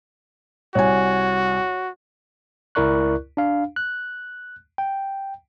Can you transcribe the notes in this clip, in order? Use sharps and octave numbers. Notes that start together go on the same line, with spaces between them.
C2 F#4 C#5 G#5
C#2 E4 A#4 D5 C#6 F#6
D4 F5
F#6
G5